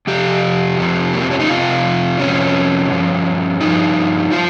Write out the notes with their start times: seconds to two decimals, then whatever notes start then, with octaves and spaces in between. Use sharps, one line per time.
0.07 F2 C3 F3 G4
0.78 F2 C3 F3
1.13 A#3
1.22 C4
1.31 C#4
1.40 D#4
1.49 F2 C3 F3 F4
2.19 F2 C3 F3 C#4
2.90 G2 F3
3.61 G2 F3 D#4
4.31 F3 F4